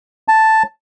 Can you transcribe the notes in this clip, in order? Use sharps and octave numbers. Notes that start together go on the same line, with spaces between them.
A5